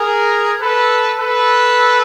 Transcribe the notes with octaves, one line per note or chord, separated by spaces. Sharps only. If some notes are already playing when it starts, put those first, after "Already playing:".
Already playing: G#4 A#4
A4 B4
A4 B4